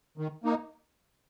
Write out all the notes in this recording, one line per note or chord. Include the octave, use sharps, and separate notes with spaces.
D#3
A#3 D#4